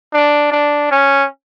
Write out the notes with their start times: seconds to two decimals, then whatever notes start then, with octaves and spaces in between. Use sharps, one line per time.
0.13 D4
0.52 D4
0.91 C#4